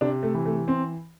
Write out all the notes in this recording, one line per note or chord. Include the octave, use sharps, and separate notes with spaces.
C3 D4
A3
E3
A3
C4